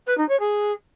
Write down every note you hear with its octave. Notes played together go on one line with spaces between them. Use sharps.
B4
D#4
C#5
G#4